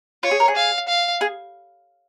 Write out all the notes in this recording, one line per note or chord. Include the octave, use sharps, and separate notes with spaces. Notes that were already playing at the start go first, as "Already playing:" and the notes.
F4 C#5
G#4
A#4
G#4
F5
F5
G#4